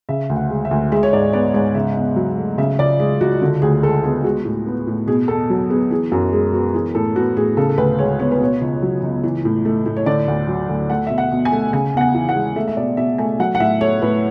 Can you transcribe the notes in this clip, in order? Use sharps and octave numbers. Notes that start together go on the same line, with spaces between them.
C#3 E5
D2
F#5
G#3
E5
D2
G#3 E5
C#5
G#2 D5
B3 D5
G#2 C#5
C#3 E5
E2
F#3
A3
C#3 E5
C#2 D5
G#3 G#4
C#2 F#4
D3 F#4
D2 G#4
G#3 A4
B3 G#4
G#3 F#4
A2
B3
A2
B2 G#4
E2 A4
F#3
B3 G#4
E3 G#4
F#2 F#4
G#3 G#4
B3 F#4
E3 G#4
A2 A4
B3 F#4
A2 G#4
C#3 A4
A4
D2 B4
G#3 C#5
B3 C#5
B4
B2 C#5
C#2
F#3
C#2
E3
A2
A3
A2
C#5
D3 D5
D2
F#3
D2
A3 F#5
B2 E5
F#5
B2
G#5
A3
C#3 G#5
E2 F#5
G#5
E3
F#5
G#3
A3 E5
E5
B2 D5
B2 E5
A3 G#5
F#3 F#5
F#5
A2 E5
A3 C#5
A2 B4